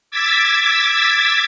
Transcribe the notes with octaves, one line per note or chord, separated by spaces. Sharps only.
D6 E6 G#6 A6 B6